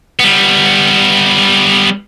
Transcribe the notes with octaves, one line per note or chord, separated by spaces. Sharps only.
G3 B3